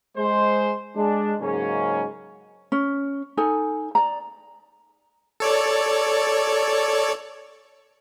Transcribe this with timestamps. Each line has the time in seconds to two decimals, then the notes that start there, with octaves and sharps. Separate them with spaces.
0.17 G#3 C5
0.96 G#3 D4
1.41 G#2 C#3 F#3 G#3 A#3 C#4
2.72 C#4
3.37 D#4 A4 G#5
3.95 D5 A#5
5.40 A4 C#5 D5